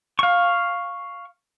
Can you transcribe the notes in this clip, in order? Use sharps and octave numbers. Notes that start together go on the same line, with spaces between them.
F5 C#6